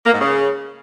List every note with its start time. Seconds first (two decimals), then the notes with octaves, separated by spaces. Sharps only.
0.06 A#3
0.14 G#2
0.21 C#3